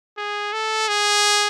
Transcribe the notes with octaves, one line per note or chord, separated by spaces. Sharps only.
G#4
A4
G#4